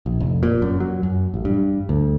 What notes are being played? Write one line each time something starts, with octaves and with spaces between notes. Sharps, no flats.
A#1
F1
A#2
F#2
F#3
F#2
A1
G2
D2